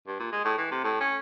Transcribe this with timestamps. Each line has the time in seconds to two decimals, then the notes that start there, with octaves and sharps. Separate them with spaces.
0.07 G2
0.19 A#2
0.32 G#3
0.45 A2
0.58 E3
0.71 C3
0.84 A2
1.00 C#4